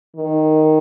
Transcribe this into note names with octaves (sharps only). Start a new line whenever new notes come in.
D#3